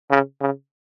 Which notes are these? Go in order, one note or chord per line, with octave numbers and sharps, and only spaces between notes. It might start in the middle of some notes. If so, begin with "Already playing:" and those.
C#3
C#3